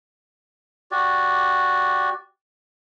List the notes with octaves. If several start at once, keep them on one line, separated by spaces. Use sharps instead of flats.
F#4 G4 D5